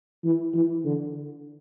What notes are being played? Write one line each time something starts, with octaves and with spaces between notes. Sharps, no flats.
E3
E3
D3